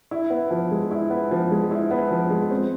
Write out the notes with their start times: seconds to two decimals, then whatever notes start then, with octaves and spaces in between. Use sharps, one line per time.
0.11 E4
0.30 B3
0.51 F3
0.71 G#3
0.91 E4
1.10 B3
1.31 F3
1.51 G#3
1.71 E4
1.91 B3
2.11 F3
2.30 G#3
2.51 C4